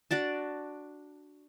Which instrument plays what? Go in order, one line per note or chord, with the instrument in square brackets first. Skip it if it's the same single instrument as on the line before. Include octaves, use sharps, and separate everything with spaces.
[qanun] D4 F#4 D5 A5